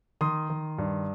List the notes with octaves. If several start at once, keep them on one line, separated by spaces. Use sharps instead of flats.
D#3 C6 D#6
D#3
G2